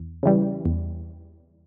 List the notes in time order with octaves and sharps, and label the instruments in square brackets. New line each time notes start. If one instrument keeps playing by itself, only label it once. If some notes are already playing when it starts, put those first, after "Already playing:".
Already playing: [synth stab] E2
C#3 E3 G3
E2